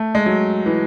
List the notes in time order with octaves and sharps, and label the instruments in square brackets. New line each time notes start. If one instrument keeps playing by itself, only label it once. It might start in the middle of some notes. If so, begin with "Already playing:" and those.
Already playing: [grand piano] A3
G#3
F#3
E3